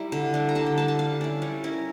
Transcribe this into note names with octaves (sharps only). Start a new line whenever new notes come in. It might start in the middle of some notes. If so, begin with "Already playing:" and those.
Already playing: G3 E4 A#5
D3
G3 D4
A#5
D3 A5
G5
G3 D4 A5
A5
G3 F5
C#4 E4 D5
G3 C#5
C#4 E4 A#4